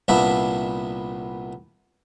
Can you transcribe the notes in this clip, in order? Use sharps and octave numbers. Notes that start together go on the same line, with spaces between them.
C2 A#2 B3 D4 E5